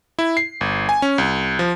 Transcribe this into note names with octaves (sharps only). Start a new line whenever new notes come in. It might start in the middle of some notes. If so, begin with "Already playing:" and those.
E4
C7
G1
G#5
C#4
C2
F3